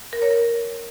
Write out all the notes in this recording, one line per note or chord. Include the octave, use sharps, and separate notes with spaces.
A#4
C#5
A#4